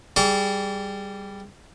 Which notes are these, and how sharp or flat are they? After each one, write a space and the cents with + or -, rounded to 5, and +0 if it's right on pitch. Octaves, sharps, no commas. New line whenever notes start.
G3 +0 G#4 +0 D6 -40